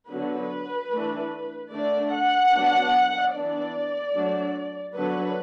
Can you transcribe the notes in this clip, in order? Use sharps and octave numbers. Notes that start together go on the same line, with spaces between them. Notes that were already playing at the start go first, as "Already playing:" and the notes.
D3 F#3 B3 B4
E3 A3 D4
D3 A3 D4 D5
F#5
F#3 B3 D4
E3 B3 D4 D5
F#3 A3 D4
D3 F#3 B3 D4 B4